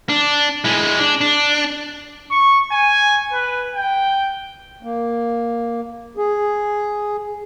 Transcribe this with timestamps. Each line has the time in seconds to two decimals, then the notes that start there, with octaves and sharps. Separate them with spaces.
0.09 D4
0.64 G#3 E4
0.99 D4
1.21 D4
2.31 C#6
2.72 G#5
3.33 B4
3.75 G5
4.83 A#3
6.17 G#4